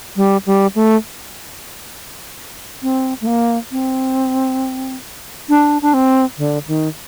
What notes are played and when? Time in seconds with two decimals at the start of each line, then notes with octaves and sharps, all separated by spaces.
0.16 G3
0.46 G3
0.75 A3
2.83 C4
3.21 A3
3.27 A#3
3.72 C4
5.49 D4
5.82 D4
5.94 C4
6.38 D3
6.68 D#3